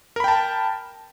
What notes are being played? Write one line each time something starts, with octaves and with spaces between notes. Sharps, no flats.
A#4 G5 A5 B5